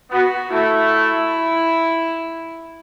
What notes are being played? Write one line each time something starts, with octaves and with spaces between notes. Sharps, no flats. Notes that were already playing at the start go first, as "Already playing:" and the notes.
B3 F#4
A3 E4